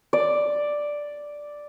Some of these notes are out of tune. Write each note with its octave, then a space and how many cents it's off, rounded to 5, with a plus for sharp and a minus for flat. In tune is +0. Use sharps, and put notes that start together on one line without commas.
D5 +0